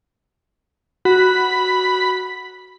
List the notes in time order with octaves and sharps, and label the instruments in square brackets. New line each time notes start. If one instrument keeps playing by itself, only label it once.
[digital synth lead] F#4 [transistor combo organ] B5